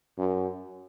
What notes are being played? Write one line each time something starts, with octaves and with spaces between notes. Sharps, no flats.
F#2